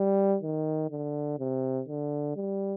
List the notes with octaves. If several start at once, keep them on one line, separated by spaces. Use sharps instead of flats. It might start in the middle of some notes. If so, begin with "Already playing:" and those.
Already playing: G3
D#3
D3
C3
D3
G3